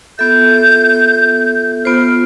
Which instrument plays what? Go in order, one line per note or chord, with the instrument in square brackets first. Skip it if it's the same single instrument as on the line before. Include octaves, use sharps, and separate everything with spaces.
[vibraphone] B3 F4 A4 E5 [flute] G6
[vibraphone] B3 F4 C5 [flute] F6